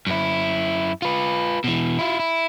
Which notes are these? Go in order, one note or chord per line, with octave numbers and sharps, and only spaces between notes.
F#2 E4
F4 B4
B2 E3
E4 F4
E4